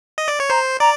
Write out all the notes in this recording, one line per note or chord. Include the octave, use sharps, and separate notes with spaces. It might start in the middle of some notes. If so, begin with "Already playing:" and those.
D#5
D5
C#5
C5 A#5
D5 A#5